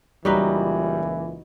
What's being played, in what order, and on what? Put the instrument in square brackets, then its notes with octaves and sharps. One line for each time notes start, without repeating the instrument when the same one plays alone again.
[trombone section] C#2 A#2 E3 [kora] F#3 D#4 B4 [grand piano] G3